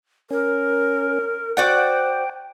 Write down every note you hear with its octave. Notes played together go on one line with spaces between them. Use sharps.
C#4 A#4
F#4 C5 D5 F#5 G5